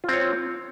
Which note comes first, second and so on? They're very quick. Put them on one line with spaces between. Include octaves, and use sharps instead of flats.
F4 C4 C#5